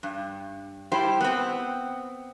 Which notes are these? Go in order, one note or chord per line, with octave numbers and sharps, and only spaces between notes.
G2
G3 E4 G4 C5
B3 C4